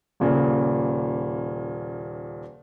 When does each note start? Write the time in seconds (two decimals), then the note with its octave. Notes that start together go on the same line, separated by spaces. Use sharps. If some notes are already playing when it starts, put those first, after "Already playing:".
0.20 D#1 A#2 C#3